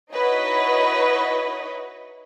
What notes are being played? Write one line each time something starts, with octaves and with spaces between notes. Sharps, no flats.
D#4 E4 F#4 B4 C#5 D#5